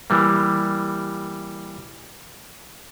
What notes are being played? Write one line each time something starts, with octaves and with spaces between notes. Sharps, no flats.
E3 G3 A#3